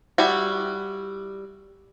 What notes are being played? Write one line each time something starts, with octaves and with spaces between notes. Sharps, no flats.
G3 E4 F#4